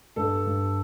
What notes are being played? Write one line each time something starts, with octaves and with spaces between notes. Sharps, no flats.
G2 A4
G2